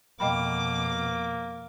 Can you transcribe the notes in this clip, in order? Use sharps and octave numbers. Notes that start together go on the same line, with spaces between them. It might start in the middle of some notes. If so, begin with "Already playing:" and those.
F2 B2 A#3 D#5 G5 B5 D6